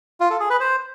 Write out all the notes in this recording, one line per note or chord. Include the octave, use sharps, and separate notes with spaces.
F4
A4
G#4
B4
C5